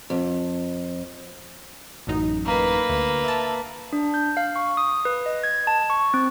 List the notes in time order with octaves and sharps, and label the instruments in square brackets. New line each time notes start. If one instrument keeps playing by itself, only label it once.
[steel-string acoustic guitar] F2
[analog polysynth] A1 F#2 D#4
[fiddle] A#3 B4
[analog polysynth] D2
E5 A5
[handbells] D4
G6
F5
C#6
D#6
B4
D#5
G#6
A5
C#6
C4